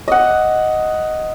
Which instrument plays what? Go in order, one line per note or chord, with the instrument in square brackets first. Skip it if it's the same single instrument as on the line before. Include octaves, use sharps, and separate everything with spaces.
[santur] D#5 F#5